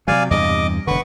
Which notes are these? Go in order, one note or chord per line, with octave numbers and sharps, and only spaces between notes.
C3 D#3 F#3 D5 F5 G#5
E2 G2 C3 D#5 D6
E1 D3 B4 F#5 C#6